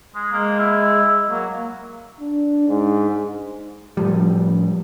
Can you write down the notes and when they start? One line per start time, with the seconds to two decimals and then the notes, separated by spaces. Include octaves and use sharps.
0.15 G#3
0.32 G#3 A#3
0.59 E4
1.30 F#3 A#3
2.20 D4
2.68 G#2
3.97 A2 F3 G3